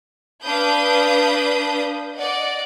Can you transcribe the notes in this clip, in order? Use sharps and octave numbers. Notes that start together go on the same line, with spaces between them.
D4 B4 F5 B5 D#6 G6
D5 D#5 F#5